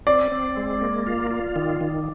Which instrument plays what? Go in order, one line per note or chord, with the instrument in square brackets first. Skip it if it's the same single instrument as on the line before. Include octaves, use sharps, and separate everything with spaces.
[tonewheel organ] C4 [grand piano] D5
[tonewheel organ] C4
G#3
A#3
F4
F4
D#3
D#3